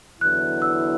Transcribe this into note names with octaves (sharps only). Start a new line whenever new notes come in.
E2 D3 F#3 B3 E4 F#6
E6